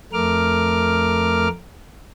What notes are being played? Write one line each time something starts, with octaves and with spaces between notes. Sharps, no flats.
F2 A3 A#4 D6 F6